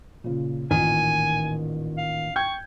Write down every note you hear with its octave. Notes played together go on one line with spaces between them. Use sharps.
A#2 C#3
A1 A#2 D#3 G#5
F5
G5 C#6 G6 G#6